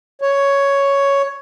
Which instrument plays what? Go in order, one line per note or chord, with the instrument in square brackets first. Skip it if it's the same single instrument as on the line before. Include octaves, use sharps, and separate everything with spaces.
[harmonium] C#5